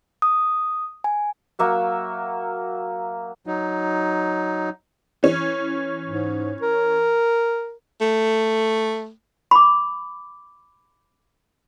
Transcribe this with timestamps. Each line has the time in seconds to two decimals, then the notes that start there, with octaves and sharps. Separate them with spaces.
0.22 D#6
1.04 G#5
1.59 F#3 A#3 E5 F#5
3.47 F#3 D#4
5.23 E3 C#4
6.06 G#2
6.62 A#4
8.01 A3
9.51 B5 D6